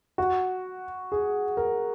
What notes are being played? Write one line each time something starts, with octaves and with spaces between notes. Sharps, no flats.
F#4
G#4
A#4